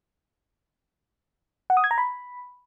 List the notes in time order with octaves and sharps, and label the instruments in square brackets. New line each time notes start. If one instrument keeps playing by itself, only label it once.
[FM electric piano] F#5
D#6
G#6
A#5
B5